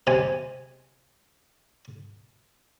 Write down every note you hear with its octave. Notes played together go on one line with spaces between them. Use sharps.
C3 G#3 G#5